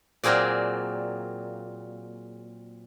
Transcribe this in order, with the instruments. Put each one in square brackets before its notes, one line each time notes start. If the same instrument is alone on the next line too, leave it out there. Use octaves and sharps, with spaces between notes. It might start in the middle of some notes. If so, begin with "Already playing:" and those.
[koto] A#2 F#3 A#3 C4 G#4 D5